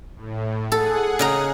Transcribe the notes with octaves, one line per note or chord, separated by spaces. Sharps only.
A2
G#4 A4 F#5
C#3 D#5 A#5